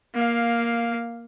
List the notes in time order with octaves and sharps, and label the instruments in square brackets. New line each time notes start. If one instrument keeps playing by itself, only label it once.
[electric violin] A#3 F5